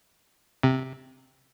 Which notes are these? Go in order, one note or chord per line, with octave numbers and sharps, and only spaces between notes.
C3